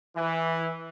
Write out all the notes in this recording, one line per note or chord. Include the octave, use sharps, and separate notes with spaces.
E3